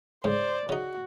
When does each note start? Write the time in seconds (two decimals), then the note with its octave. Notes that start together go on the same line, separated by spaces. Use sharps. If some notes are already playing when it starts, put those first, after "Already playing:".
0.24 G#2 C#3 C5 D5
0.69 C#3 D#4 F#4